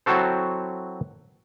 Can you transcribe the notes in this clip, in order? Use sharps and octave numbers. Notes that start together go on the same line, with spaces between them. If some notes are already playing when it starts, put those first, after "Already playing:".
F#3 C4 E4 F#4 A4 C5